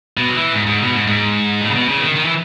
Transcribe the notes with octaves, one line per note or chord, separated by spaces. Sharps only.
B2
F#3
E3
G#2
G#2
B2
G#2
G#2
A2
C#3
B2
C#3
E3
D#3
D#3
E3